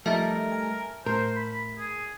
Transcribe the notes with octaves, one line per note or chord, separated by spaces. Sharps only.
F3 G3 A3 D#4 A#4 E5 A5
G#5
A2 A#4 C5
B5
G#4